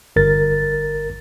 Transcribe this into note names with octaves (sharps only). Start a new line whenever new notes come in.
G1 A#4 A6